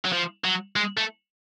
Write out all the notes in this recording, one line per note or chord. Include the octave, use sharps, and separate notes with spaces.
F#3
F3
F#3
G#3
A3